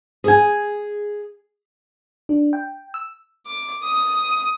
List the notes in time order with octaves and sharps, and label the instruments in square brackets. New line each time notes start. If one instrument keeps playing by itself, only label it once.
[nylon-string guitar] G#4 G#5
[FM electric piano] D4
G5
E6
[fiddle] D6
D#6